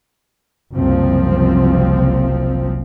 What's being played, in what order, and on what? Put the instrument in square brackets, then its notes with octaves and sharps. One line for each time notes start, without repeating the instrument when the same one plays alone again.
[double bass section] F#1 C2 F3 C4